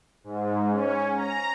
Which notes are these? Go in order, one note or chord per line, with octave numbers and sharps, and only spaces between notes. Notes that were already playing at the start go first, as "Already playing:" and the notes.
G#2
C#4
A#5